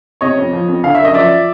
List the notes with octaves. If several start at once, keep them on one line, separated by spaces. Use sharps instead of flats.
C3 C#5 D#5
F2
F3
F2
D3 F5
E5
F#2 D#5
F3 D5 E5